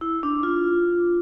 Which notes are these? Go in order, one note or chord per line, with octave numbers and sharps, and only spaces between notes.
E4
D4
F4